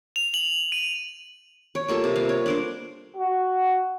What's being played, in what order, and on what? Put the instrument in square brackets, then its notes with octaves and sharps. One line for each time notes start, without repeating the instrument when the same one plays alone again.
[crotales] F7
F#7
D#7
[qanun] C#5
G3 A#3 F4 A4
C3
F5
C#5
D4 A#4 C5
[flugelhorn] F#4